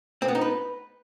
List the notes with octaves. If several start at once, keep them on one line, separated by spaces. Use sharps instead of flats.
C4
B3
D#4
B4